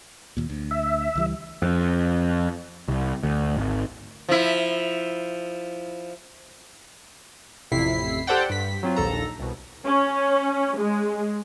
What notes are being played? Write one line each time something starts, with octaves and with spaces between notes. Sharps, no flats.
D#2 A#2
D2
E5
C#2 E3 G3
F2
C2
D2
G#1
F3 E4
A1 F2 C3 E4 B6 C7
G4 A4 C5 D5 F#5 G5
G2 B6
F#3 C4 F4
A#1 D#2 A4 A#5
C2 B2
C#4
G#3